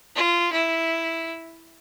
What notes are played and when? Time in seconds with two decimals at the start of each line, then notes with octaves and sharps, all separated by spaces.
0.16 F4
0.53 E4